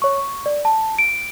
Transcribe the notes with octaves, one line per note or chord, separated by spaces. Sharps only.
C#5 C#6
C#6
D5
A5
D7